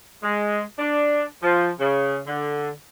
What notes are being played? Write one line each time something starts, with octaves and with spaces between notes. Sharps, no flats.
G#3
D4
F3
C#3
D3